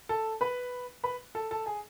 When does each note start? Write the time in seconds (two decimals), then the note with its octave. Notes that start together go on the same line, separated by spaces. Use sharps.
0.09 A4 A5
0.41 B4 B5
1.04 B4 B5
1.35 A4 A5
1.51 A4 A5
1.66 G#4 G#5